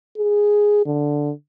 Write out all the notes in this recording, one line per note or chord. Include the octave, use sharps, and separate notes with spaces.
G#4
D3